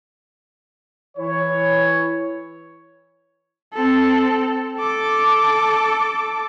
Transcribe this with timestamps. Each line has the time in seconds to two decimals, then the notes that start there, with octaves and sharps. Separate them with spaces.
1.18 E3 E4 C#5
3.74 C4 A4
4.77 A4 D6